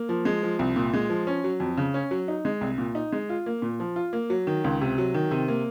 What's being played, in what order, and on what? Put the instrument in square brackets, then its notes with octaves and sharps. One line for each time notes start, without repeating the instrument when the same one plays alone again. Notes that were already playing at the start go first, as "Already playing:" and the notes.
Already playing: [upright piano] A#3
F3
G#3
F3
C2
A#2
G#3
F3
C#4
F#3
F2
C#3
C#4
F#3
D#4
G#3
C2
A#2
D#4
G#3
F4
A#3
A#2
F3
F4
A#3
F#3
D#3
C#2
C3
F#3
D#3
C3
A#3